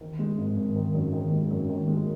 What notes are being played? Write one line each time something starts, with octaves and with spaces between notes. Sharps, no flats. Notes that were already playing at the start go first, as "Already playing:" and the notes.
D#3
G#3
G#1
G#1
D#3
F#2
D#3
G#3
F#2
D#3
G#3